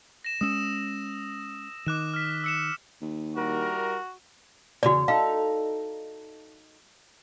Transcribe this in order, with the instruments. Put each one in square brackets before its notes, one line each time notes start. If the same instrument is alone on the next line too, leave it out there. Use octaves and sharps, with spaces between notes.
[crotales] A#6 E7
[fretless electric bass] G#3 C#4 [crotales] D#6 E6 E7
[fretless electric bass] D#3 [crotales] D6 F#6 E7
[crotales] F6 B6
E6 C#7 E7
[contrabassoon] D#2
[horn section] G3 E4 A#4 [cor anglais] F#4
[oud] E2 C#3 C#5 [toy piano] F#4 D5
[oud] D#4 A4 [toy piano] F5